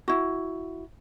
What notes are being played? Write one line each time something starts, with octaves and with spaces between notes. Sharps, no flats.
E4 F#4